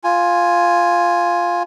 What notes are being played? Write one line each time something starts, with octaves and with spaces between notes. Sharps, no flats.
F4 G#5